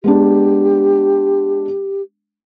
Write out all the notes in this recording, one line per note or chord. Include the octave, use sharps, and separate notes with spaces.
G#3 B3 D4 G4